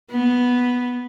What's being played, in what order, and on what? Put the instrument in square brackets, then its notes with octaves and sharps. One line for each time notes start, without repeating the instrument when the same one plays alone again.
[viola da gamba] B3